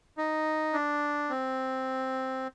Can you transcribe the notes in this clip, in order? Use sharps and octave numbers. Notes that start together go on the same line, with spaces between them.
D#4
D4
C4